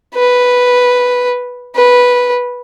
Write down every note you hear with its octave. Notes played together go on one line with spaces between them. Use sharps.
B4
B4